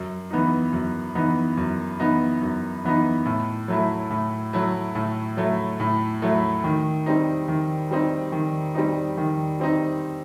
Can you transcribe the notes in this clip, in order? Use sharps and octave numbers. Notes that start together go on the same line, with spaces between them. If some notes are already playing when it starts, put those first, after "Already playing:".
Already playing: F#2
E3 B3 D#4
F#2
E3 B3 D#4
F#2
E3 B3 D#4
F#2
E3 B3 D#4
A2
F#3 A3 E4
A2
F#3 A3 E4
A2
F#3 A3 E4
A2
F#3 A3 E4
D#3
G3 C4 D#4
D#3
G3 C4 D#4
D#3
G3 C4 D#4
D#3
G3 C4 D#4